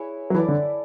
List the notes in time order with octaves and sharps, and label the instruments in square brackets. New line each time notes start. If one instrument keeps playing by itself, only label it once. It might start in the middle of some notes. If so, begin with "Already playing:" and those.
Already playing: [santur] E4 G#4 B4 C#5 E5
[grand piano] F#3
[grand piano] E3 [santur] E4 A4 D5
[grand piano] D3